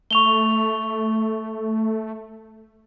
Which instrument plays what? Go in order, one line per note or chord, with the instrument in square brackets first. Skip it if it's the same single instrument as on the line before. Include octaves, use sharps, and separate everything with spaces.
[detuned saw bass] A3 [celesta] C#6 F7 G7